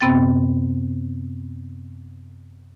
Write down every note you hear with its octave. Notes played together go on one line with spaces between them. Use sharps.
F#2 C3 B3 C4 G5 A6